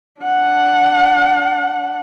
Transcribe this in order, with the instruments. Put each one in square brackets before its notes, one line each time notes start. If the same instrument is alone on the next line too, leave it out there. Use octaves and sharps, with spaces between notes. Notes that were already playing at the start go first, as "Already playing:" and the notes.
[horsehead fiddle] D4 F#5